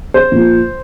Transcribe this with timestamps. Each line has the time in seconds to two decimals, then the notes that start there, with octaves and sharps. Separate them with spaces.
0.14 C5
0.32 A#2 F3